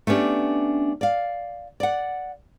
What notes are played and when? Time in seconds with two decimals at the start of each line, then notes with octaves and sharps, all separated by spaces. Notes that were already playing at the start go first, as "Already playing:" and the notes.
0.07 A3 B3 C#4 D4 G4
1.01 D5 F5
1.80 D5 F#5